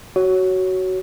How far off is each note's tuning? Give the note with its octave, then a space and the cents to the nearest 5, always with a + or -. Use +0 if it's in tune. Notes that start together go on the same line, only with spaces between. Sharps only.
F#4 +15 C#5 +0